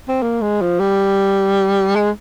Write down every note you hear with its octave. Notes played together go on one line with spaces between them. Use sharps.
C4
A#3
G#3
F3
G3
G#3